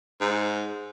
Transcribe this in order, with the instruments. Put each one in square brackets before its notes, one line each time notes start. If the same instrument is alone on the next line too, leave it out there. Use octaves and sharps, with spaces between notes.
[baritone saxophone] G#2